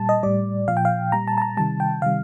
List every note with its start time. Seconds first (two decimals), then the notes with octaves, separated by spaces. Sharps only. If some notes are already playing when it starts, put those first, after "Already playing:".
Already playing: A#2 G3 A5
0.09 D#5
0.23 A2 G3 D5
0.68 A#2 F3 F5
0.77 G5
0.85 F5
1.12 A#2 G3 A#5
1.28 A5
1.38 A5
1.42 A#5
1.57 C3 D#3 G3 A5
1.80 G5
2.02 C3 D#3 G3 F5